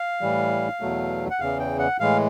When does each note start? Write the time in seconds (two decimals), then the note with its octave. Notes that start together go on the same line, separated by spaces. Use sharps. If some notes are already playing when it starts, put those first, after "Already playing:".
Already playing: F5
0.21 A2 E3 G3
0.81 E2 B2 F#3 A3
1.30 F#5
1.40 E2 C#3 E3 F5
1.59 G5
1.79 F#5
2.00 A2 E3 G#3 F5